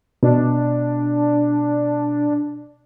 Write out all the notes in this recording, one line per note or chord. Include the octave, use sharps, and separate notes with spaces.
B2 D4